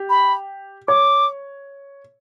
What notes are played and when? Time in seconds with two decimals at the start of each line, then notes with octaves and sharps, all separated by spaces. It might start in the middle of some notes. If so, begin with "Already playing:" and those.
Already playing: G4
0.10 B5
0.88 C#5 D6